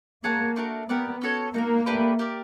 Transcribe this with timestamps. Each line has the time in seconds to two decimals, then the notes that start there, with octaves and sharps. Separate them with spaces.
0.24 A#3 G#4 C#5 F#5 A5
0.56 A3 D4 F#4 A#4
0.88 B3 G4 A#4 D5 F#5
1.22 C#4 F#4 A4 C#5
1.54 A#3 D#4 F#4 A#4
1.86 A3 D4 G4 B4
2.19 G4 A#4 D5